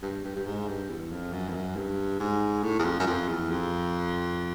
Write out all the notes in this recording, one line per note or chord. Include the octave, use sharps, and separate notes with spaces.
G2
G2
G2
G#2
G2
E2
F2
F#2
F2
F#2
G2
G#2
A2
E2
F2
F#2
F2
E2
F2